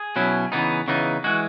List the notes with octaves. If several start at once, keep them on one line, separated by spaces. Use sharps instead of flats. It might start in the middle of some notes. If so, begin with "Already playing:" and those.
Already playing: G#4
B2 F#3 C#4 E4
C#3 E3 B3 D#4
C#3 E3 B3 D#4
E3 G#3 F#4